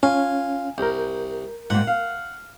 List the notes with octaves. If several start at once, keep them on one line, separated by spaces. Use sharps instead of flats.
C#4 F4 G#5
C2 A#4 G6
G#2 G3 A#3 F#5
F5